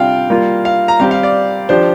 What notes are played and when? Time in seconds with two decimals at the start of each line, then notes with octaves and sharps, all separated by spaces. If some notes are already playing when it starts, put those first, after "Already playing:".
Already playing: C3 G3 D4 F4 F5 G5
0.30 G3 A#3 F4
0.65 F5
0.88 A#5
1.00 G3 C4 G4 F5
1.11 F5
1.23 D5
1.69 F3 D4 G4 C5